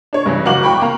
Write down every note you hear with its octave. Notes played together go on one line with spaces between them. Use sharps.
D4 C#5
G2 E3
F#1 F#4 F5 D6 F#7
G5 B5 C#6 D6
A#3 F5 A#5